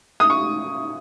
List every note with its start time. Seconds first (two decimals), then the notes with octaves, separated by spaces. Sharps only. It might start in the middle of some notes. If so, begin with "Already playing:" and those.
0.20 D#6
0.30 C#6